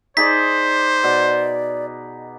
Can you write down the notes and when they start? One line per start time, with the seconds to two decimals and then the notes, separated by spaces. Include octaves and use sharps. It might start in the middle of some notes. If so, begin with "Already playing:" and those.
0.17 D#4 G#4 C5 D5 B6
1.04 B2 D5